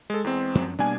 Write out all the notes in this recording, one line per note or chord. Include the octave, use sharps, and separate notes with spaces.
G#3 A4
E2 G#3 C4
F#2 F3 F#3
B2 G3 A#3 D4 G#5